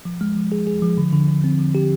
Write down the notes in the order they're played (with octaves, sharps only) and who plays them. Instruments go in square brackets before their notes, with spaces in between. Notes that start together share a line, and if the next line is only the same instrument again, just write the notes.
[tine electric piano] F3
G#3
F3
G#4
G#4
F3
D3
D3
D3
C4
F3
G4